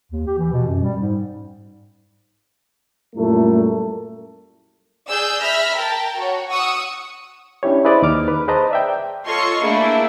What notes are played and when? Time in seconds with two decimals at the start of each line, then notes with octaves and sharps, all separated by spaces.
0.12 D#2
0.27 G4
0.38 E3
0.53 B2
0.68 F#2
0.82 G3
1.00 G#2
3.16 F#2 A#2 G3 A3 E4 A#4
5.09 G#4 D5 E6 G6
5.41 E5 B5 E6 F6 A#6 B6
5.74 A#4 G5 A5
6.18 F#4 C#5
6.51 F#5 C#6 D#6 E6
7.63 C#4 D4 E4 G4 C#5
7.85 E4 G#4 B4 C5 D5 D#5
8.02 D#2 D#4 D6 F6
8.28 B4
8.48 G#4 B4 C5 D#5 A5 A#5
8.71 D5 E5 G5
9.26 F4 A4 C#5 D#5 C6 C#6
9.62 A3 A#3 D4 E4 G#4